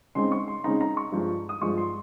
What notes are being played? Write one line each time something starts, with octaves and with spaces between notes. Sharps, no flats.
C#3 G#3 C4 D#4 C6
C#6
C6
C#3 G#3 C4 D#4 A#5
A#5
C#6
G2 F3 G#3
D#6
G2 F3 G#3 C#6
C6